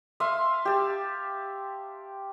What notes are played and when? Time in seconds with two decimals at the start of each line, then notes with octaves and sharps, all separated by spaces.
0.20 E5 F5 C6 D#6
0.65 G4 A5